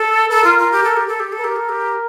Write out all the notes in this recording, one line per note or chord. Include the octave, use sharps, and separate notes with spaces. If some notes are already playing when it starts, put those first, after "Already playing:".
Already playing: A4
A4 A#4
F4
F4
G4
A4
G4
A4
G4
A4
G4 A#4
A4
G4